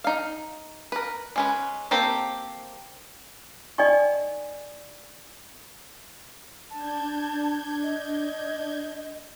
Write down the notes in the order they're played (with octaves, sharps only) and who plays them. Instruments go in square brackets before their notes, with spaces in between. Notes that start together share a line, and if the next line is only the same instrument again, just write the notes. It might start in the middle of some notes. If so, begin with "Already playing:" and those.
[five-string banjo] D#4 F5
A#4 B4
G#3 C#4 B4
A#3 C4 G4 A4 C5
[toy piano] D#4 D5 D#5 G5 G#5 C#6
[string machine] D4 G6 G#6 [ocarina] A5
[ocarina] D#5